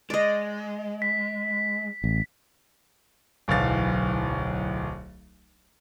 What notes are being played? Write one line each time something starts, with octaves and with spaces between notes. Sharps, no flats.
G#3 D5 D#5
B6
A1
D1 B1 E3 F5 A6